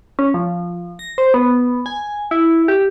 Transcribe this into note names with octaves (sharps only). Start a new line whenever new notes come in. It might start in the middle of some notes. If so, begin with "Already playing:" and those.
C#4
F3
A#6
C5
B3
G#5
E4
G4